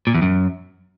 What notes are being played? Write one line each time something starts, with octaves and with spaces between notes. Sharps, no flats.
A#2
E2
F#2